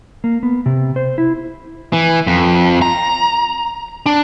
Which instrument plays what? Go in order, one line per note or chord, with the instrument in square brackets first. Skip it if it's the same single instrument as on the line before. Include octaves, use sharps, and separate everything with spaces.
[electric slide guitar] A#3
B3
C3
C5
E4
[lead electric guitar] E3
F2
A#5
D4